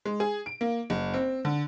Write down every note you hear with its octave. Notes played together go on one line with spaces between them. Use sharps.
G#3
G#4
D7
A#3
F#1
C4
D3